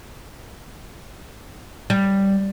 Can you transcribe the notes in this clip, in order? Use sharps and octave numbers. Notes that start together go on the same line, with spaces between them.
G3